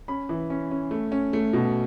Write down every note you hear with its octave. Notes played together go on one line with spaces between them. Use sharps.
C#4 B5
E3
C#4
C#4
A3
C#4
A3
B2